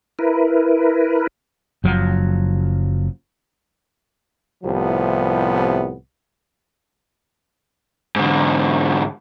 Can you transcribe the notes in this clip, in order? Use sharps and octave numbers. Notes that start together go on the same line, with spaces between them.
E4 A#4 B4
F#1 F3 F#3
C2 A2 C3 F3 B3
G#2 D3